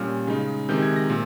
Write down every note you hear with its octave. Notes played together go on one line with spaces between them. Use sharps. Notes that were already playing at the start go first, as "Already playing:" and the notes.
Already playing: A#2 G3 C#4 F6
C#3 G#3 D#4
C3 D#3 G#3 D#4 G6
G#6
A#6
A#2